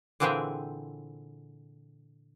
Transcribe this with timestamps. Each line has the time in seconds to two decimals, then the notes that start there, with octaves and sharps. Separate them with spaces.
0.20 A#2 D3 E3 C4 G4 G#4